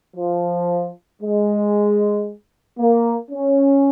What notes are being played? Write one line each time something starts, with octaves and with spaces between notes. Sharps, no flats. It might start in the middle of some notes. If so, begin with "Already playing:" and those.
F3
G#3
A#3
C#4